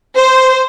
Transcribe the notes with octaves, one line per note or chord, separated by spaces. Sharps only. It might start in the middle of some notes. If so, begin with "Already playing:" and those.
C5